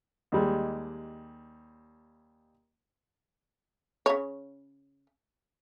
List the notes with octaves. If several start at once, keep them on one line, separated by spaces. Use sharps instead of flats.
D#2 G3 G#3
C#3 C#5